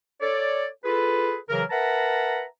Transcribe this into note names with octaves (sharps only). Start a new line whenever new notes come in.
A4 C#5 D5
F4 G#4 A4 B4
C#3 E3 F#3 A#4
A#4 B4 E5 F#5 A5 A#5